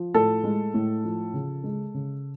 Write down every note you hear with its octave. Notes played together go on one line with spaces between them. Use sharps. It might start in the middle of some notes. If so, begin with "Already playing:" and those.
Already playing: F3
A2 A4
G#3
A2
F3
C#3
G#3
C#3